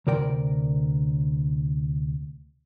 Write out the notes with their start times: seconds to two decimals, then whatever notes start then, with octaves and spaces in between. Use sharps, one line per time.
0.07 D2 C3 A#4 D5 G5